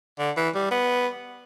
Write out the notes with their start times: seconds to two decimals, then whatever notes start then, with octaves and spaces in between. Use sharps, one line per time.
0.19 D3
0.37 E3
0.54 G3
0.71 B3